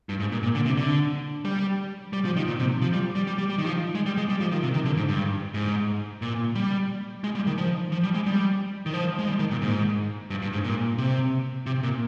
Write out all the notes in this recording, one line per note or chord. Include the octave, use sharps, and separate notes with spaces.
G2
G#2
A#2
A#2
D3
C3
D3
G3
G3
F3
D#3
A#2
C3
F3
G3
G3
G3
G3
G3
D#3
F3
G#3
G3
G#3
G3
F3
D#3
C3
D#3
D3
G#2
G2
G#2
A#2
G3
G#3
G3
D#3
F3
F3
G3
G#3
G3
D#3
F3
G#3
G3
D#3
A#2
G#2
G2
G2
G#2
A#2
C3
C3
A#2